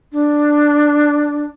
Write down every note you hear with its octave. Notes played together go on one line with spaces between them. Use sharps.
D4